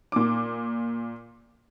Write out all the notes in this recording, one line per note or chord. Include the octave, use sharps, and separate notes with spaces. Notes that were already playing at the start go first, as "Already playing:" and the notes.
A#2 D6